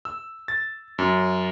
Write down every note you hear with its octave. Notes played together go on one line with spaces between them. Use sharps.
E6
A6
F#2